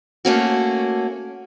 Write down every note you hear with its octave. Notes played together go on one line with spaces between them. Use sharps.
A3 A#3 C#4 F#4